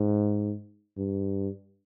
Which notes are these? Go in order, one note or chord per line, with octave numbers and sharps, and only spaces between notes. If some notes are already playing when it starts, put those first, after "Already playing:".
Already playing: G#2
G2